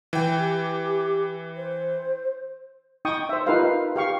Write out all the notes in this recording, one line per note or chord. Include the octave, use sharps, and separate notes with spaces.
E3 G5
G4
C5
D#4 G5 C#6 D#6
C5 E5
D#4 F4 G4 A#4 B4 F5
G4 F5 C#6